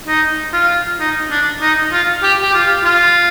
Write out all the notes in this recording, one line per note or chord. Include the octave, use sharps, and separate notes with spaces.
D#4
F4
D#4
D4
D#4
F4
G4
G4
F4
F4